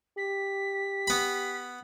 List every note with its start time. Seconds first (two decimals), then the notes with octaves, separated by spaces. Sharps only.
0.18 G4 B6
1.07 B3 B5